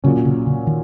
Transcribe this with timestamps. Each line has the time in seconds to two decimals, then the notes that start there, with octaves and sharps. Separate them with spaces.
0.04 A#2 C#3 F#3 C#4
0.25 C#3
0.47 C#3
0.67 D#3